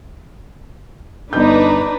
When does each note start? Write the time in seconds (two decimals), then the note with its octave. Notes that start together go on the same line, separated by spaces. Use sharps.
1.33 G1 D4 D#4 B4 G6